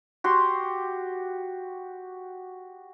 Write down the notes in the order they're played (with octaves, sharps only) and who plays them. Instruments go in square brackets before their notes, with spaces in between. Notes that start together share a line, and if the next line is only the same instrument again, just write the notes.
[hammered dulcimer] F#4 G4 C6